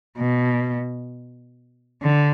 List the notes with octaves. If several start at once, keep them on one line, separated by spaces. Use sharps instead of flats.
B2
D3